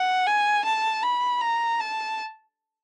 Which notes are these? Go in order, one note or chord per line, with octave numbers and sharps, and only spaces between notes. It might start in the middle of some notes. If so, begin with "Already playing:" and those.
Already playing: F#5
G#5
A5
B5
A#5
A5